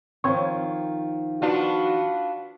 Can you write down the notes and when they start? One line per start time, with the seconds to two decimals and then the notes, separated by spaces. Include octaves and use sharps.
0.24 D#3 F3 C4 C#5
1.42 B3 D4 F4 F#4